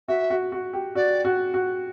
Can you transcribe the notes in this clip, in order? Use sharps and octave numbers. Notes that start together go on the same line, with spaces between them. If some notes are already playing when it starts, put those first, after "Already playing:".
F#4 E5
F#4
F#4
G4
F#4 D5
F#4
F#4